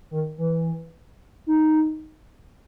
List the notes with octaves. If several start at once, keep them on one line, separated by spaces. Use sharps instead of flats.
D#3
E3
D#4